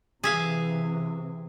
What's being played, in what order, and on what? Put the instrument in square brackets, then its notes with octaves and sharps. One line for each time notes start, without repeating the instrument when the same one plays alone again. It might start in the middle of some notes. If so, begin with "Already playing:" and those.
[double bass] C3 E3 [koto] G#4 E5 F5